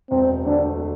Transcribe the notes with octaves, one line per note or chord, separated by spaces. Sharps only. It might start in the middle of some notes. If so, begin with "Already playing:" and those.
E1 C4
D2 D3 A3 D4